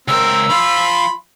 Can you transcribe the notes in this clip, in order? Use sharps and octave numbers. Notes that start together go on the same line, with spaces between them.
C#2 C4 A#4 E6
F3 F4 B5 C6